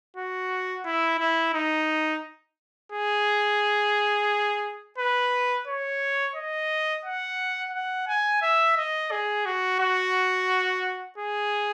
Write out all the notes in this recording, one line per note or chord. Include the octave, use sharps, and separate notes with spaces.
F#4
E4
E4
D#4
G#4
B4
C#5
D#5
F#5
F#5
G#5
E5
D#5
G#4
F#4
F#4
G#4